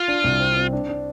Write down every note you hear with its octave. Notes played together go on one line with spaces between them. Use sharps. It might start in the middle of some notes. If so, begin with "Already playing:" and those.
Already playing: F4
D4
C2
C4
C4
D4
D4